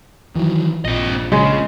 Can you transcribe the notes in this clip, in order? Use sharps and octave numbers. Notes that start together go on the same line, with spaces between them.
D#3 E3 F#3
A#1 C4 D#5
C#3 G#3